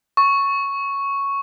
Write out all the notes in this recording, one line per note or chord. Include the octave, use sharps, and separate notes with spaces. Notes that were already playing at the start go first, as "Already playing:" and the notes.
C#6